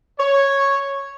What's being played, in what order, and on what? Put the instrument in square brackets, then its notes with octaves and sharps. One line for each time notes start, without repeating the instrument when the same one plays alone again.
[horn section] C#5